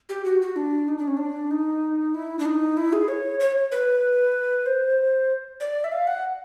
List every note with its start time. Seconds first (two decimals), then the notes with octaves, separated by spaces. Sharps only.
0.09 G4
0.25 F#4
0.42 F#4
0.56 D4
0.88 D#4
0.98 D4
1.07 C#4
1.17 D4
1.51 D#4
2.14 E4
2.39 D4
2.45 D#4
2.77 E4
2.93 G#4
3.08 C#5
3.40 C#5
3.72 B4
4.66 C5
5.60 D5
5.84 E5
5.92 F5
6.07 F#5